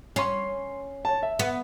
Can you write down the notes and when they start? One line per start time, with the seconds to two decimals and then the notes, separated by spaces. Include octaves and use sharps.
0.16 C#4 C6 C7
1.05 C#5 A5
1.23 E5
1.39 B3